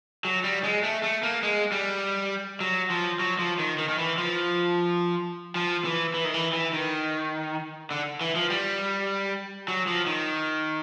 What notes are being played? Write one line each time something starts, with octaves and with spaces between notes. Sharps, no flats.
F#3
G3
G#3
A3
A3
A#3
G#3
G3
F#3
F3
F#3
F3
D#3
D#3
D#3
E3
F3
F3
E3
E3
D#3
E3
E3
D#3
D3
E3
F3
G3
F#3
F3
D#3